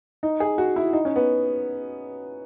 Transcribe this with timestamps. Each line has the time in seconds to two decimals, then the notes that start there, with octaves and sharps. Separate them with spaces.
0.23 D#4
0.40 G#4
0.58 F#4
0.76 E4
0.93 D#4
1.05 C#4
1.16 B3